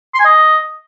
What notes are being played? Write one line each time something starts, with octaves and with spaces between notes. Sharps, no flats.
C6
G#5
D#5